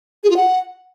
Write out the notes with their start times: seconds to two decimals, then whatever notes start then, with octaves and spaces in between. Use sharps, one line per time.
0.24 G#4
0.30 F4
0.36 F#5